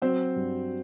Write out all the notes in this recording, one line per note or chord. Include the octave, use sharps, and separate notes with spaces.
F#3 C4 C5
G2